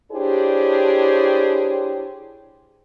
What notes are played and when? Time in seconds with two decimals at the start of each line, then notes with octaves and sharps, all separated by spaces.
0.11 D4 E4 G4 G#4 C5 C#5